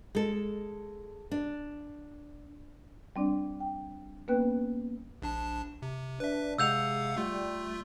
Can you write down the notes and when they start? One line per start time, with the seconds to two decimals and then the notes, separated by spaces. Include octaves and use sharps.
0.15 G#3 A4
1.31 D4
3.16 G3 C4 D4 D5
3.60 G5
4.28 A#3 B3 C#4 B4 G5 F#6
5.22 A#1 D4 A5
5.82 C3
6.20 D4 B4 E5
6.58 C3 G#3 F5 F#5 E6 G6 F7
7.17 G3 A3 F4